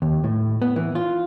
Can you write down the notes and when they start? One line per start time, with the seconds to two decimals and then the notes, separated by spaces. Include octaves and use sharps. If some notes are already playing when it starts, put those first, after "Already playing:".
0.02 D#2
0.24 A2
0.62 B3
0.76 E3
0.95 F4